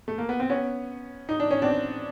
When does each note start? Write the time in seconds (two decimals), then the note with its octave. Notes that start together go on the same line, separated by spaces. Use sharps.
0.08 A3
0.18 A#3
0.29 B3
0.40 C4
0.49 B3 C#4
1.29 D#4
1.40 D4
1.51 C#4
1.62 C4 D4